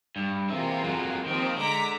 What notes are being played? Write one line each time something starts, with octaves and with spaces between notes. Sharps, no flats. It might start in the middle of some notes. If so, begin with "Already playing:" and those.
G2
E3 G#3 A#3 C4 F4 E5
F2 F#3
D#3 F3 A#3 C4 G4
D3 G#3 A#5 D6 B6